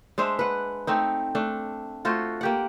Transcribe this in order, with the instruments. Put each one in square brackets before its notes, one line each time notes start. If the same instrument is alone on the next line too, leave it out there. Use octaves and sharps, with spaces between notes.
[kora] G#3 D4 C5 E5
B4 F#5
A3 C4 D#4
A3 D4
A3 F4 F#4 C5
A#3 G4 F#5